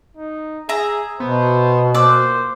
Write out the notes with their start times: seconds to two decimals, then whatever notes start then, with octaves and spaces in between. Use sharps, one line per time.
0.17 D#4
0.69 G#4 E5 A#5
1.20 B2 B3 C5
1.94 A#2 C5 D6 E6 F#6